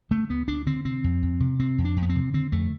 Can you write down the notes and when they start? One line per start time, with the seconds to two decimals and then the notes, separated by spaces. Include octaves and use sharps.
0.11 D3 A3
0.29 D2 B3
0.48 D2 D4
0.66 D3 C4
0.85 C3 C4
1.04 F2
1.23 F2
1.40 C3
1.59 C3 C4
1.78 F2
1.84 D4
1.96 F2
2.02 B3
2.09 C4
2.15 C3
2.34 D3 C4
2.52 F2 A3